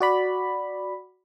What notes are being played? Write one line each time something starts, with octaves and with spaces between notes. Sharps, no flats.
F#4 D5 B5